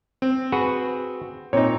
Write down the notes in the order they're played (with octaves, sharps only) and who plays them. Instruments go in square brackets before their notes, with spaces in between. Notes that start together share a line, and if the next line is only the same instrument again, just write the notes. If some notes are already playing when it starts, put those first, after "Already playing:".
[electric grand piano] C4
[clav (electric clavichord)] F#4 G#4 B4
[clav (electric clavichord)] A#2 D#4 [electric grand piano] C4 C#5